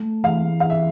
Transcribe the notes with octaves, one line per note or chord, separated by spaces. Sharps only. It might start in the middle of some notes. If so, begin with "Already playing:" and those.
Already playing: A3
E3 F5
F5
E5